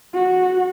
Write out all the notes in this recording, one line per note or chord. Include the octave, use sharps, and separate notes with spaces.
F#4